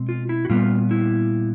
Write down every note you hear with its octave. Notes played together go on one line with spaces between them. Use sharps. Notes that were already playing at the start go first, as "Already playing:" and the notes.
Already playing: B2 G#3 C4
F4
E4
F#4
A#2 G3 B3 F4
E4